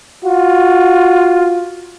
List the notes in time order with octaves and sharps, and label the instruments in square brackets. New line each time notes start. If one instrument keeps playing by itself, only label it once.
[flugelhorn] F4 [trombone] F#4